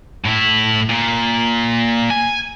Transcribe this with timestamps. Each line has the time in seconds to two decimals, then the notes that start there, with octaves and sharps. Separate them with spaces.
0.25 A2 E4
0.89 A#2
2.11 G#5